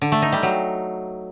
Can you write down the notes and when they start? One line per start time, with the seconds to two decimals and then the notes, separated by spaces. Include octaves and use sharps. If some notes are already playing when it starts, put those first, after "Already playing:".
0.02 D3
0.12 A3
0.22 D#4
0.32 G3
0.43 F#3